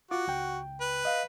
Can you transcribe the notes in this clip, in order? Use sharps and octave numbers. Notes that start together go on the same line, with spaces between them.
F4 F#4 D6
C#2 C#3 G5
B4
D#5 F5